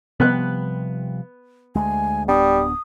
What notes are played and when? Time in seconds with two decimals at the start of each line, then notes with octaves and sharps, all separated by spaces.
0.20 C3 F3 G3 B3 B4 F#6
1.76 D2 G#3 G#5
2.29 D1 G3 B3 D4 D#6